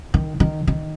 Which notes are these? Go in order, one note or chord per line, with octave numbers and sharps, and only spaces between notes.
D#3
D#3
D#3